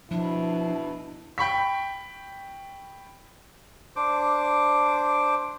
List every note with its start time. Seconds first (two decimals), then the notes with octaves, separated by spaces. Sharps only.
0.11 B2 F3 D4 E4
1.38 G5 B5 C#6 B6
3.96 D4 C5 D6